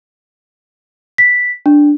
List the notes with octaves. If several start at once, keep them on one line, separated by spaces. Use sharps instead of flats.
B6
D4